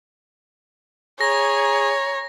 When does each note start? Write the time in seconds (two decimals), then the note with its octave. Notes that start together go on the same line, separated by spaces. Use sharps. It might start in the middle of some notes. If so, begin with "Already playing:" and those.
1.21 G#4 C#5 A#5 A#6